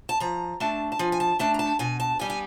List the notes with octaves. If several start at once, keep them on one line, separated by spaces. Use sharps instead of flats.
A5
F3 A#5
A3 D4 A5
A5
F3 G#5
G#5
A5
A3 D4 A5
A#5
A5
B2 G#5
A5
G3 B3 G#5
G#5